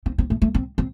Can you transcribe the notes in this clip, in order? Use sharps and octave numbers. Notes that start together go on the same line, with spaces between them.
C4
C4
A3
A3
C4
C4